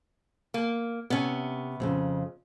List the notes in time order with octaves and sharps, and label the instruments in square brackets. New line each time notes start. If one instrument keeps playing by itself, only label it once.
[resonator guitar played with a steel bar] A#3
[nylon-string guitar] C3 [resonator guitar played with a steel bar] B3 C#4
[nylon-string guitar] F2 A#2 C#3